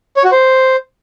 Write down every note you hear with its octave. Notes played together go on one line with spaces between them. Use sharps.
C#5
F#4
C5